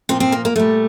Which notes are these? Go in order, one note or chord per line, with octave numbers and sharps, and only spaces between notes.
A#2 F3 C4
C4
A#3
A#3
A#2 G3 A3